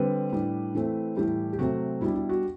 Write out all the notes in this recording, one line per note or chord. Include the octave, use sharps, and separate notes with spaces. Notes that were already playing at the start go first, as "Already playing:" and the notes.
Already playing: D3 G3 C4 B4
A2 G3 D4
E3 A3 C4
A2 E3 G3 G4
G4
C3 F#3 A3 C4 F#4
B2 G3 D4 E4
E4
F#4